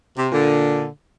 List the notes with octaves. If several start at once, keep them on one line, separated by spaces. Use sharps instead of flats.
C3
A#2 D3